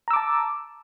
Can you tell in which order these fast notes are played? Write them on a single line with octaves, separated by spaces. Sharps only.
A#5 E6 D6 A5